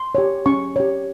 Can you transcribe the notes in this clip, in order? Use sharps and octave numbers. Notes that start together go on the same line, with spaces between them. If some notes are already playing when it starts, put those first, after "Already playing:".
Already playing: C6
G4 C#5
C#4 C#6
G4 C#5